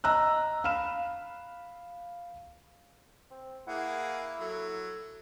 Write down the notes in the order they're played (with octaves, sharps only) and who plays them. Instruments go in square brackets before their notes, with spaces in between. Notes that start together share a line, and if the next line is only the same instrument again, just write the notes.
[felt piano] D#5 A#5 E6 F#6
F5 B5 F6 E7
[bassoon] C4
[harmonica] A#3 G#4 [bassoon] E4 [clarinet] F#5
[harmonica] F#3 [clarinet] A4